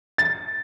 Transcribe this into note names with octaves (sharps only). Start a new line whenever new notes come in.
A6